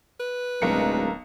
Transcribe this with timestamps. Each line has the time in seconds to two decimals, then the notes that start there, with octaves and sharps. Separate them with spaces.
0.20 B4
0.62 D1 B1 G#3 A#4 C#7